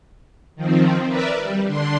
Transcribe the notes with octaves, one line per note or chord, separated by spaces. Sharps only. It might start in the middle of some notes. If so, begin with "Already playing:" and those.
D#3 F3 C4
A#4 B4 D5 E5
G3
D3 D4 C6